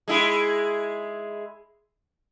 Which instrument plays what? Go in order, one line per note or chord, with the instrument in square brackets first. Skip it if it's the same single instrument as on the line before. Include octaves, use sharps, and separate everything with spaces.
[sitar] G#3 E4 G#4